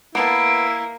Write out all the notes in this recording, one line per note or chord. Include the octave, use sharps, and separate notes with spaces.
A#3 B3 E4 B4 A5 D7